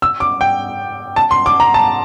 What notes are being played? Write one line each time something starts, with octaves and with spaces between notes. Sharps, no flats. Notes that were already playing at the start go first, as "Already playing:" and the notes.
E6
D6
G5
A5
C6
D6
A#5
A5